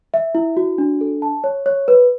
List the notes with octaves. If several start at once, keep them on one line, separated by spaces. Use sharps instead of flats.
E5
E4
F#4
D4
A4
A5
C#5
C#5
B4